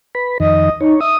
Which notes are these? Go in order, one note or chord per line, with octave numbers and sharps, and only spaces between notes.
B4 B5
F2 D#3 D#5
D#4 C#5
E5 D#6